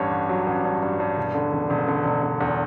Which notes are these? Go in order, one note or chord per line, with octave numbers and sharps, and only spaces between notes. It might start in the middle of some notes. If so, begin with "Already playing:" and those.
Already playing: A1 G2 C#5
A1
F#3
A1
G2
G2
G2
E1
D3
E1
E1
D3
E1
E1
E2